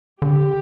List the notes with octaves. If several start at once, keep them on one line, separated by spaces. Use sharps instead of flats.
D3 G4